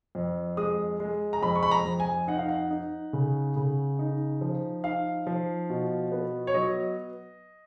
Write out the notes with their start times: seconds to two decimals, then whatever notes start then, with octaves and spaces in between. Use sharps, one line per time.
0.15 F2
0.57 G#3 D#6
1.00 G#3
1.33 A#5
1.42 F2 B5
1.55 C#6
1.63 B5
1.71 A#5
1.85 F2
2.00 G#5
2.27 D#4 F#5
2.38 F5
2.49 F#5
2.71 D#4
3.13 C#3
3.56 C#3
3.99 D#4
4.41 F3
4.84 D#4 F5
5.27 F3
5.70 B2
6.12 B3
6.47 C#5
6.54 F#3 D#5